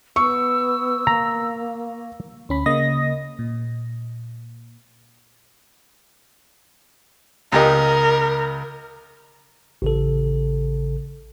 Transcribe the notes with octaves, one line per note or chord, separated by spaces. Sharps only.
B3 C#6 E6
A#3 A#5
D2 C#4 B5
C#3 A#3 D#5 D#6 A#6
A#2
C#2 G4 A#4 D#5
A1 C#3 A4